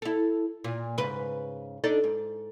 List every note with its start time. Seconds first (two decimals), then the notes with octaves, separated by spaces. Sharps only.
0.02 E4 A4
0.64 A#2
0.98 G#2 C#3 B4
1.84 D4 D#4 A4
2.04 G#2